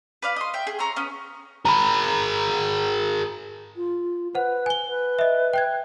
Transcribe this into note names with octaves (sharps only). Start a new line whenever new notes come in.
B4 D5 F5
D#5 C6
E5 G5
G#4
C#4 A#5 C6 E6
B3 C#4
G#4 A#4 A#5 B5
F4
B4 C5 F#5
G#5 G7
B4
D#5 E5
G5 F#6 G#6